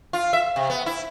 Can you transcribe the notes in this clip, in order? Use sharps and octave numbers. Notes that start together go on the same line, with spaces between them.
F4
E5
C3
B3
E4